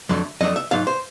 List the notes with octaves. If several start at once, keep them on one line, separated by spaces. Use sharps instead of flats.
F2 D3 F#3 A3
F2 D3 F#3 A3 D#5
E5
G#2 D#3 F#3 F5
C5